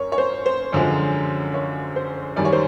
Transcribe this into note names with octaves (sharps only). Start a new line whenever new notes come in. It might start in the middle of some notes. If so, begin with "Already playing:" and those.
Already playing: F#2 A#4 C#5
C#5
C5
C5
F#2 D3 F3 G#3
C#5
C5
F#2 D#3 G3 D5
C#5
C5